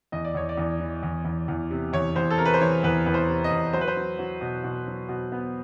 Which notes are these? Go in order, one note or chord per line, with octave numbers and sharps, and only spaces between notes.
E2 D#5
D5
E2 C#5
D5
E2
E3
E2
E2
E2
C3
E2 C#5
E2 C5
A4
C3 A#4
B4
C5
E3 C#5
E2 B4
E2 B4
C5
C3
D#5
E2
F#3 C5
B4
C5
F#3
F#3
B2
B2
F#3
B2
B3